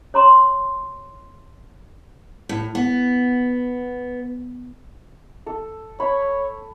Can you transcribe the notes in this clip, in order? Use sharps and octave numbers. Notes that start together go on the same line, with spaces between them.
C#5 A#5 C6
A2
B3
A4
C#5 B5